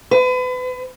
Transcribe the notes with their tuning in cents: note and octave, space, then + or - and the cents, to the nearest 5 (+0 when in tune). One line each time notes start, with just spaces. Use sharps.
B4 +35